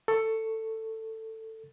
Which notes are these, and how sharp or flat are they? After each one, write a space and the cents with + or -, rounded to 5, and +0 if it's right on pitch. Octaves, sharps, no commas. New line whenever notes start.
A4 +15 C#6 +0